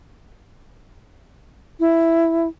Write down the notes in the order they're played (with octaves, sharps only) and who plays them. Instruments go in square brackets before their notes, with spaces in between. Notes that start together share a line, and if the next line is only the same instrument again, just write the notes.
[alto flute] E4